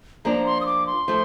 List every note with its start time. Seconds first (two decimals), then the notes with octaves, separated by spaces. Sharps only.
0.25 F3 A#3 D4 A#5
0.46 C6
0.61 D#6
0.66 D6
0.87 C6
1.08 F3 A3